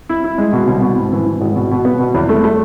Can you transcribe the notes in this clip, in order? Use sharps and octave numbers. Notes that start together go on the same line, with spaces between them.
E4
E4
G#3
B2
C2
B2
G#2
E3
E3
G#1
B2
B2
B3
B2
E2
A3
A3